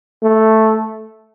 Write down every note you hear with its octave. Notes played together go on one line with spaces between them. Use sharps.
A3